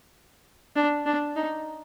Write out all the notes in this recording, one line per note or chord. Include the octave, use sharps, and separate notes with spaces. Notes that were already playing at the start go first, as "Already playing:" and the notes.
D4
D4
D#4